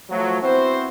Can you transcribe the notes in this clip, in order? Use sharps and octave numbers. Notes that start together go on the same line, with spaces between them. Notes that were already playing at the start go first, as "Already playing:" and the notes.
F3 F#3 A3
B3 C4 E4 F#4 C5